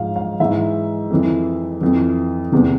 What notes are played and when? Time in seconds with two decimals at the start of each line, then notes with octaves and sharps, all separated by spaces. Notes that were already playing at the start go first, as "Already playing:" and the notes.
Already playing: G#2 F3 F5
0.16 F5
0.40 G#2 E3 E5
1.10 F2 E3
1.81 F2 E3
2.52 E2 C3 E3